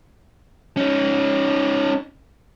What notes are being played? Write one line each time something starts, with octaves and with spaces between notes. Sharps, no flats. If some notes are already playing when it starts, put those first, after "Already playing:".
C#4 D#4